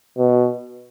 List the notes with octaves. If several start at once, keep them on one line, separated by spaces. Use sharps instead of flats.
B2